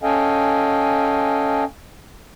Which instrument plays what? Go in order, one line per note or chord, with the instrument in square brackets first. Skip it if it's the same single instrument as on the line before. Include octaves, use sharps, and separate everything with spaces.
[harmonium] C#4 A4 D#5 F5 G5 G#5